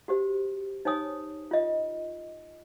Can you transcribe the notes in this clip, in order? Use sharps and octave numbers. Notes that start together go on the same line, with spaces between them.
F#4 G4 C5
D#4 C5 C#5 G#5 D#6
F4 D#5